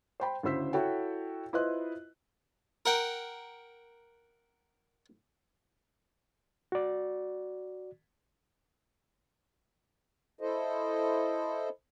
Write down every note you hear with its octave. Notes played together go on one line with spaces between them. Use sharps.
C5 G5 B5
D2 C#3 E4 C5 E6 B6
E4 F#4 A4 C#5 F#5 G5
E4 F4 B4 C5 D#5 F#6
A#4 F#5 G5
F#4 D5
E4 A4 C5 D#5